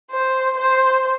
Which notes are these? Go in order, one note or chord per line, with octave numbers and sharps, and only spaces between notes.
C5
C5